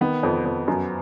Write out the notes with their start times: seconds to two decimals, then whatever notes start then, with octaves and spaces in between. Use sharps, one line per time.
0.01 D#3 B3
0.23 F2
0.45 F2
0.68 F#2